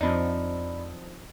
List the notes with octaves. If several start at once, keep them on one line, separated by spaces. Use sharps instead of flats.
F2 F3 C4 D4 D#4 D5 D#5 B5